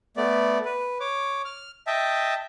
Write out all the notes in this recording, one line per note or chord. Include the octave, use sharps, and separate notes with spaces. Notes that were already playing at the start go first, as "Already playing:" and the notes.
A3 B3 D5
B4
C#5 D6
F6
D#5 E5 G5 A5